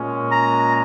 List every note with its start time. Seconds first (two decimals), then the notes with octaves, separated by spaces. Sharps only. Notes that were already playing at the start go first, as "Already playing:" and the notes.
Already playing: A#2 G#3 C#4
0.31 A#5